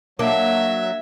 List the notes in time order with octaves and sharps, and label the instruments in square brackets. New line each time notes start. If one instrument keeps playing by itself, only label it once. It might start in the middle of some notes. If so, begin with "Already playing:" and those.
[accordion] F#3 [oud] A#3 D4 [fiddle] E5